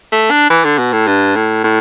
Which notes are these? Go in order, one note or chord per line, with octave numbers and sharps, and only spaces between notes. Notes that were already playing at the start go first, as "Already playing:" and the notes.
A3
D4
E3
D3
B2
A2
G2
A2
A2